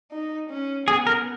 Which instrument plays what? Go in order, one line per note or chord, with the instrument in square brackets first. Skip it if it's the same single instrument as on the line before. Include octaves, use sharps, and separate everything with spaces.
[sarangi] D#4
C#4
[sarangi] B3 [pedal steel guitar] G#4
[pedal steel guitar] A#4